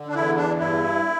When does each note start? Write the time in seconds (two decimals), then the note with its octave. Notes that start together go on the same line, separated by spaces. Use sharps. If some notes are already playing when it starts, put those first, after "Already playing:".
Already playing: D3
0.08 D4
0.15 E2 E4
0.37 D4
0.59 G2 E4